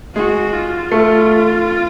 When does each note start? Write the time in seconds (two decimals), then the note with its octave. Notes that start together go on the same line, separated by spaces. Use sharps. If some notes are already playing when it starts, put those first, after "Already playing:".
0.16 G#3 F#4
0.53 F4
0.92 A3